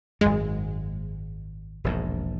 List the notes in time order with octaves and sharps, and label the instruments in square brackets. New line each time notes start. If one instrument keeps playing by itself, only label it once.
[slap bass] G#1 F#2 [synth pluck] G#3
[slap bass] E1 A#1 G#2